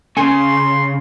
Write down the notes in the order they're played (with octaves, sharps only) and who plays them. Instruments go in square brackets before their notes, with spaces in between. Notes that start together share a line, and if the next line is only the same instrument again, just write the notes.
[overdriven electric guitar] C#3 [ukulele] G#5 [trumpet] C6